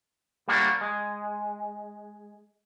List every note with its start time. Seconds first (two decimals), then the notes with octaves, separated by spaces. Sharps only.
0.48 G3 A3 A#3 D4 F#4
0.81 G#3